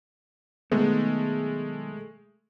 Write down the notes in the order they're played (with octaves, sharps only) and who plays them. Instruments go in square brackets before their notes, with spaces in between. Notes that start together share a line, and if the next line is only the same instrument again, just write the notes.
[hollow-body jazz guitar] B1 D#3 B3 [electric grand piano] G#3 A3